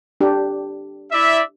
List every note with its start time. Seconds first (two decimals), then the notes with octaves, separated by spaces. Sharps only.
0.21 D4 G4
1.12 E4 D5 E5